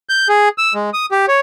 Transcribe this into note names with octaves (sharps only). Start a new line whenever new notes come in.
G6
G#4
E6
G#3
D#6
G4
C#5